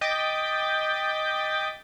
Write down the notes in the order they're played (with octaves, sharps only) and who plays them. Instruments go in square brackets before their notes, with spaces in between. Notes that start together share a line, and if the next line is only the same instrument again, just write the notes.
[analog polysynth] D#5 G5 D6 G6 A6 B6